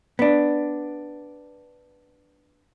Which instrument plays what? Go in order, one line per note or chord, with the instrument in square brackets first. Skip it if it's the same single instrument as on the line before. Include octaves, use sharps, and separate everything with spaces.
[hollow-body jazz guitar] B3 D4